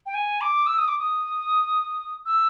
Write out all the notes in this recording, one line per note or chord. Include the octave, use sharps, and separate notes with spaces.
G5
G#5
D6
E6
D#6
D6
D#6
E6